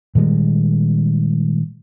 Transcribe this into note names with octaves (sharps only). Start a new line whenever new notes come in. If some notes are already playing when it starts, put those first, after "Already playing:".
A#2 D#3 G3 G#3